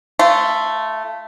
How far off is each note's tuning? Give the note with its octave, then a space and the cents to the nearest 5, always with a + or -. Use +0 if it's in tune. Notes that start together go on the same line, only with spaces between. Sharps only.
A3 +0 F4 -25